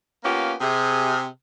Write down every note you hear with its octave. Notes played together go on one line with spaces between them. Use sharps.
A#3 B3 C#4 F4 G4
C3 G#4